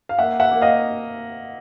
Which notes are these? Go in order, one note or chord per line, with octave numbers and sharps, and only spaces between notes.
F5
A#3 E5 F#5
E5 F#5
A#3
D#5 F5